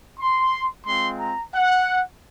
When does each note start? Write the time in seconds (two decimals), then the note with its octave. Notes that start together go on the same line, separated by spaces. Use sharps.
0.19 C6
0.86 G#3 C4 F4 C6
1.20 A#5
1.53 F#5